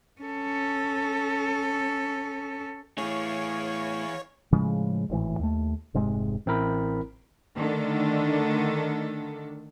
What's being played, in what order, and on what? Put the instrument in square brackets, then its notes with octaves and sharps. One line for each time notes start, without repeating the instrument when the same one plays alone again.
[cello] C#4 A4
[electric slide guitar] A2 [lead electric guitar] E3 G#4 [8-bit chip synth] C#5 [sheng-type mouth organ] F5 G#5 C#6
[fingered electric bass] A2 C#3 F3 G#3
G#1 A2 E3
D#2 A3
F1 G#2 C3 G#3
[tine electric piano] A1 C4 E4 A#4 B5
[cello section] D3 D#3 A3 D4 A4